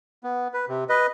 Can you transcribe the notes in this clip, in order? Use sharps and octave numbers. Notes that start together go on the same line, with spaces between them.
B3
B4
C3
B4 D#5